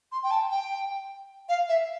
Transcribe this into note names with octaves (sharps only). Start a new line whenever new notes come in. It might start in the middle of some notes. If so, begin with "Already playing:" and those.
C6
G5
A5
G5
F5
E5